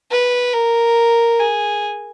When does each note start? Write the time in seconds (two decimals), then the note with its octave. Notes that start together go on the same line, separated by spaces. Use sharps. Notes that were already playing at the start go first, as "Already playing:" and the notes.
0.11 B4
0.54 A#4
1.39 G#4